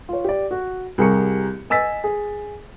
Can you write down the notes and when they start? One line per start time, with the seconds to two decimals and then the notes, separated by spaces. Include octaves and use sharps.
0.09 F4 C#5
0.25 G4 D5
0.51 F#4
0.98 C2 G4 G#4 A#4 C#6 C#7
1.70 D#5 G#5 E6 A6 B6
2.04 G#4